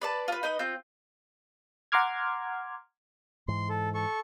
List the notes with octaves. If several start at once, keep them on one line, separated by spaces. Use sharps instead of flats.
B4 D5 A5
F4 B4
D#4 B4 D#5
C4 F4 G6
F#5 A#5 C6 D6 F6 G#6
G#2 E3 C6
A4
A4 C#6